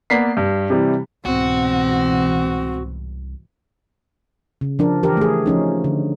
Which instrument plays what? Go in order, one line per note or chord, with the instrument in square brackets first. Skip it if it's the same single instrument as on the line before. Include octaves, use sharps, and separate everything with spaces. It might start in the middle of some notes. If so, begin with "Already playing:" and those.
[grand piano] A#3 B3 B4 D5 B6 C7
G2
C3 E3 G3
[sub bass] C2 [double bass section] G#2 B2 E3 [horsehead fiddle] C4 [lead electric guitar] F#4
[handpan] C#3
F3 D4 A#4
E3 G4 A#4
A3 G#4
F3 C#4 D#4
D3